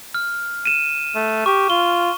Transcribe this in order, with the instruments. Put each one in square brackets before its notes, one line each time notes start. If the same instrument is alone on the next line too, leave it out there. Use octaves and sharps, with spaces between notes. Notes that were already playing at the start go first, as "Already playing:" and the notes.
[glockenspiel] F6
D#7 E7
[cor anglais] A3
[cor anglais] G4 [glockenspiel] C#6
[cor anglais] F4 [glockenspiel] G7